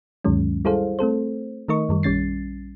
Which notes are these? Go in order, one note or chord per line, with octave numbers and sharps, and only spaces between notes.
D2 G2 D#3 F#3 G#3 C#4
G3 E4 G#4 A4 C5 F5
A3 C4 A4 C5
D#3 A3 D#4 A#4 D#5 C#6
F#2 D#3 G3
A#1 G3 C#4 A6 C7